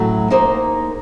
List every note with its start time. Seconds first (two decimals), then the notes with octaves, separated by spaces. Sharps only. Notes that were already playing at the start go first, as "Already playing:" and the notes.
Already playing: A2 F#3 A3 C#4 F#4
0.30 A#3 D#4 G#4 C5 D#5